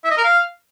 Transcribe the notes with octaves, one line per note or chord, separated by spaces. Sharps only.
E5
D#5
A#4
F5